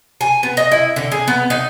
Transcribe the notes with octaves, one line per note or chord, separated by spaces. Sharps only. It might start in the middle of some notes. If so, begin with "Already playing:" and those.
G#5
B3
D#5
E4
D3
G#4
B3
D#4